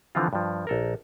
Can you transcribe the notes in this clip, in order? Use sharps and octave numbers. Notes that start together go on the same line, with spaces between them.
D3 E3 F3 C4 F4
G2 F3
A#1 A4 A#4